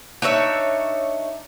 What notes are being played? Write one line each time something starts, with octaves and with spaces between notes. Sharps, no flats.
D4 D#4 C#5 E5